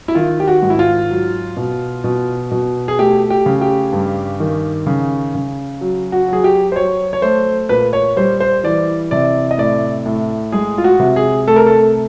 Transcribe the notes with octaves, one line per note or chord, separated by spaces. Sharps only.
E4
D#3 F4
G4
F#4
G#2
E4
F4
F#3
B2
B2
B2
G#4
A3 G4
G4
C#3
G4
G2
D#3
C#3
C#3
F#3
F#4
F#3 G#4
G4
C5
F#3 C#5
C#5
A3 C5
A#2 B4
C#5
G3 C5
C5
E3 D5
C3 D5
D#5
A2 D5
A2
G#3 G#4
F4
F#4
C3
G#4
A3 A4
A#4
A4